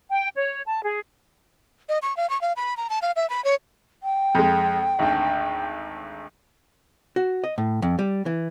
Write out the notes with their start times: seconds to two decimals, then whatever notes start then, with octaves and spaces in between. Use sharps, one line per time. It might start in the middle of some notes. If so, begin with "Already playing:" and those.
0.10 G5
0.36 C#5
0.66 A5
0.83 G#4
1.89 D#5
2.02 C#6
2.17 F5
2.30 C#6
2.41 F5
2.57 B5
2.77 A#5
2.90 A5
3.02 F5
3.16 E5
3.30 B5
3.44 C#5
4.03 G5
4.35 F2 G#3
4.99 G#1 D2
7.16 F#4
7.44 D#5
7.58 A2
7.82 F2
7.99 G3
8.26 E3